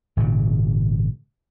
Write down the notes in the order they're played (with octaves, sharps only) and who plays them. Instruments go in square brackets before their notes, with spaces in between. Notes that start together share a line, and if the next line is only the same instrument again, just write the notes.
[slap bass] G#1 A#2 C#3